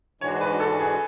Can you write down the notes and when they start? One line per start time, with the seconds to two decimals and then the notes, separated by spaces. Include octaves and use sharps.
0.21 G#2 E3 G#3 D4 F#4 C#5
0.41 B4
0.60 A4
0.79 G#4